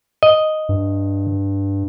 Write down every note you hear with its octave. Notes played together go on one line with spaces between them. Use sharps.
D#5
G2